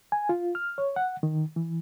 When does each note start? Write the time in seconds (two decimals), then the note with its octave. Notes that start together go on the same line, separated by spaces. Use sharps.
0.12 G#5
0.29 F4
0.55 F6
0.78 C#5
0.96 F#5
1.23 D#3
1.56 E3